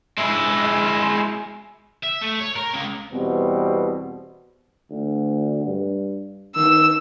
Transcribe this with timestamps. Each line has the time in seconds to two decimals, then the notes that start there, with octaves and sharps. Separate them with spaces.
0.18 G#3 E4
2.03 E5
2.21 A3
2.40 C#5
2.56 A#4
2.74 C#2
3.12 E2 B2 G3 C4
4.90 D2
5.66 G2
6.56 D#3 E6